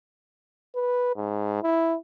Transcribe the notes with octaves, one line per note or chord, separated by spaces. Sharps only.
B4
G#2
E4